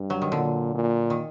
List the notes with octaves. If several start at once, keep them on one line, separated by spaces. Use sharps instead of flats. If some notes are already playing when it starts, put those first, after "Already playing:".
Already playing: G2
F#3
D#3
A#2 D3
A#2
D#3